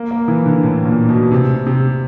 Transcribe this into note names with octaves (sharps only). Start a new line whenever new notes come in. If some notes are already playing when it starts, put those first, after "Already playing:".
Already playing: A#3
A#3
E3
D3
A2
A#2
B2
C3
C3